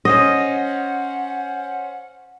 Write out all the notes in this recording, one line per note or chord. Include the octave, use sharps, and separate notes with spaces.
C#4 C5 D#5 F#5 A#6